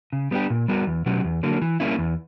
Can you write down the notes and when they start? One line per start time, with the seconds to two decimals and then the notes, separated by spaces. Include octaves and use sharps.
0.13 C#3
0.31 G3 B3 D4 G4
0.50 A#2
0.68 G3 B3 F#4 A#4
0.87 E2
1.06 B2 F#3 C#4 G4
1.24 E2
1.43 D3 F#3 A#3
1.62 E3
1.80 G3 A#3 C#4 E4
1.99 E2